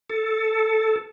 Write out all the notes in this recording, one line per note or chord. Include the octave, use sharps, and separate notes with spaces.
A4